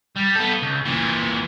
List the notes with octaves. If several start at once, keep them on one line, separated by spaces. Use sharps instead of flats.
G3
B3 A4
C#2
A#2 E3